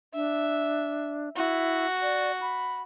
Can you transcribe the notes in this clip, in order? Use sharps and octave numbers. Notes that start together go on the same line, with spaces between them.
D4 E5
E4 F#4
D5
B5